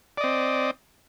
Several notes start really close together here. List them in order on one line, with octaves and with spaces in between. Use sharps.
D5 D#5 C4